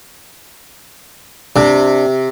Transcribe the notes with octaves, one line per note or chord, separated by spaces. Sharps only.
C3 D4